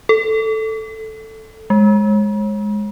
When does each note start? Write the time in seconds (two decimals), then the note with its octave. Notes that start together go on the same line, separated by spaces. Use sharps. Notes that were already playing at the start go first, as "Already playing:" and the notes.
0.09 A4
1.70 G#3